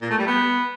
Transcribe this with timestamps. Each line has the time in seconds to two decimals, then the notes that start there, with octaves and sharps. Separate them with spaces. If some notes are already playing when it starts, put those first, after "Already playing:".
0.01 A#2
0.10 A3
0.18 G3
0.27 B3